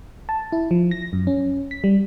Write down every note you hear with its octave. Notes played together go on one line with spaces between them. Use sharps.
A5
E4
F3
A#6
F#2
C#4
B6
G3